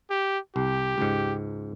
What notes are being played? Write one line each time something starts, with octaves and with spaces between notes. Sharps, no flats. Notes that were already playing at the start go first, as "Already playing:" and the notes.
G4
C2 G4
C#2 G#2